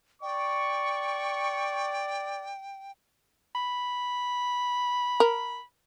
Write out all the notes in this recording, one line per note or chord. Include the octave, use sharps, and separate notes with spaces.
D5 G5 C#6
B5
A#4